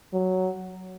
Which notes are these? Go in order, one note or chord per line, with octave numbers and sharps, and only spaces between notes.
F#3